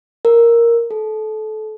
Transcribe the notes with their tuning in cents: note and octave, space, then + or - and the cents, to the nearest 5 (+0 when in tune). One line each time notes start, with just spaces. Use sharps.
A#4 +0
A4 -25